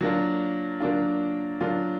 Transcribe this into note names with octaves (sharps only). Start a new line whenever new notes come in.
F#3 A#3 D4 F4
F#3 A#3 D4 F4
F#3 A#3 D4 F4